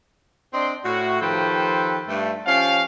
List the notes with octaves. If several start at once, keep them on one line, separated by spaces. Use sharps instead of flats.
C4 D4 D5 D#5 C6
A2 F#4
D#3 F3 G4 A4 B4 C5
G2 A3
F3 C#4 G4 C5 F5